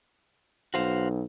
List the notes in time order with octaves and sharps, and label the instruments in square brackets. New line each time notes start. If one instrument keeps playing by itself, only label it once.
[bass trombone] B1 [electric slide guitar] F#4 C5 F5